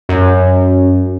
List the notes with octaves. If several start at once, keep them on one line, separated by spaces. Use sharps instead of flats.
F#2